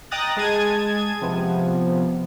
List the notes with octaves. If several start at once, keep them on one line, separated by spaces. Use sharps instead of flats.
D#5 G5 A#5 D#6 F#6 A6
G#3 G#4 A5 G#6 D#7
C3 F3 B3